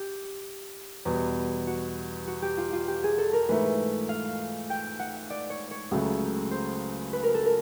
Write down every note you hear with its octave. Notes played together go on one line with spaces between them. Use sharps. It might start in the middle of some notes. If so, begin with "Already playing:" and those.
Already playing: G4
E2 B2 G3 B3
F#4
F#4
G4
F4
F4
G4
G#4
A4
A#4
G#2 E3 A3 B4
F5
G5
F#5
D5
C#5
C#5
C#2 C#3 F#3 A3
C5
B4
A#4
A4
A#4